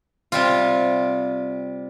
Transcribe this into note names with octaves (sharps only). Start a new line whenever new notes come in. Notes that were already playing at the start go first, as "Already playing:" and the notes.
C3 G3 F4